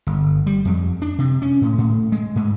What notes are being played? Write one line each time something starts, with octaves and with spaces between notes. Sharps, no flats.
G1
G3
F2
D4
C3
C#4
A2
A2
G#3
G#2